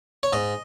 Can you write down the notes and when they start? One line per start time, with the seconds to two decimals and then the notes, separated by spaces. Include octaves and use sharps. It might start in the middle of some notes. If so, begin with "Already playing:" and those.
0.23 C#5
0.33 G#2 D#5